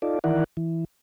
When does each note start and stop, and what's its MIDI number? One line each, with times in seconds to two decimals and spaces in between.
0.02 0.19 63
0.02 0.19 65
0.02 0.19 69
0.02 0.19 74
0.24 0.44 51
0.24 0.44 52
0.24 0.44 64
0.24 0.44 70
0.24 0.44 74
0.24 0.44 78
0.57 0.85 52